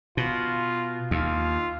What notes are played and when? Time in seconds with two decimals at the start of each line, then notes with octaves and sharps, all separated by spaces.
0.17 B2 F4
1.11 D#2 F4